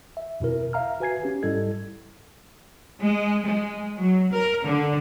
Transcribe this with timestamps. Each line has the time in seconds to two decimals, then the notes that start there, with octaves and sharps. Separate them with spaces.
0.17 E5
0.40 F2 B2 E4 A#4
0.73 E5 F5 A#5 F6
1.00 F#4 B4 G#5 G#6 C7
1.23 C#4 G4
1.43 G#2 G3 E4 A4 D#5 G#6
3.00 G#3
3.45 G#3
3.97 F#3
4.32 A#4
4.64 D3